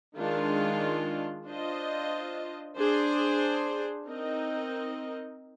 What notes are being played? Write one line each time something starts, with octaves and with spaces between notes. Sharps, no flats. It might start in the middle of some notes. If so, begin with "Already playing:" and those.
D#3 G#3 D4 F4
D4 F4 C5 D#5
D4 G#4 C5
C4 D#4 A#4 D#5